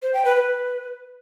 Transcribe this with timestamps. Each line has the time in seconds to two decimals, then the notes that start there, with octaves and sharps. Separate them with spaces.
0.02 C5
0.14 G5
0.25 B4
0.36 B4